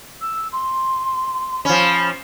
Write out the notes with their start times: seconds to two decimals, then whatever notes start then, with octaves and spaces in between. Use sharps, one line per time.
0.21 E6
0.52 C6
1.65 F3 C#4 B5